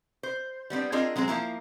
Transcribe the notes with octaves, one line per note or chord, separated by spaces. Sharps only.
C5
G3 B3 C4 D4
C4 D4 F4 G#4 A#4 D#5
F#3 G#3 C4 G#4
F3 A#3 E4 A#5